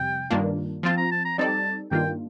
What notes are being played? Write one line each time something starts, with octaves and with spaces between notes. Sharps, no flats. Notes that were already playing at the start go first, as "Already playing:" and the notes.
Already playing: F2 C3 G3 G5
G2 D#3 A#3 D4 F4
F3 C4 F4 A5
A#5
A5
A#5
G3 C4 D#4 A4 D5 A5
G2 D#3 A#3 D4 F4 G5